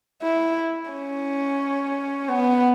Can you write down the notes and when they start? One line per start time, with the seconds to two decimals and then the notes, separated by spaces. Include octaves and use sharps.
0.22 E4
0.90 C#4
2.29 B3